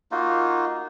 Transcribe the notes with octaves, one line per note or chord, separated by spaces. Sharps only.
A#3 D#4 F4 F#4